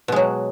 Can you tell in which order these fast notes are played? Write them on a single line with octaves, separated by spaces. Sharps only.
B2 G#3 F#3